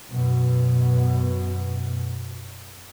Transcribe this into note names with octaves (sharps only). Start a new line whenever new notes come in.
F#2 B2